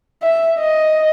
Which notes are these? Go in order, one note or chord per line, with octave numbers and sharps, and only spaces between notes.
E5
D#5